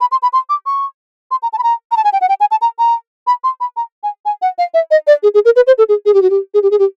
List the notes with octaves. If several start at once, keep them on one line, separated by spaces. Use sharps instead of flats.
B5
C6
B5
C6
D6
C#6
C6
A#5
A5
B5
A#5
A#5
A5
G#5
G5
F#5
G5
G#5
A5
A#5
A#5
B5
C6
B5
A#5
G#5
G#5
F#5
F5
E5
D#5
D5
G#4
G#4
A#4
B4
C5
A4
G#4
G#4
G4
F#4
G4
G#4
G4
G#4
G4